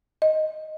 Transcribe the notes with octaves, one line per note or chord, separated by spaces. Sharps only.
D#5